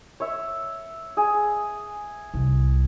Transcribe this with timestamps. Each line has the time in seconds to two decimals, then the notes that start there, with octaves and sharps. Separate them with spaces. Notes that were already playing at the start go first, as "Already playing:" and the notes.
0.20 C#5 E5
1.17 G#4
2.34 C2